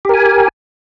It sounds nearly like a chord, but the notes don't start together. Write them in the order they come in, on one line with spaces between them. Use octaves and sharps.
G4 A#4 G#5